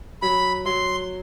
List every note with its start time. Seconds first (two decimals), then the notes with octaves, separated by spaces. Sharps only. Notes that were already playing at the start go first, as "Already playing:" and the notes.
0.22 F#3 B5
0.66 F#3 C6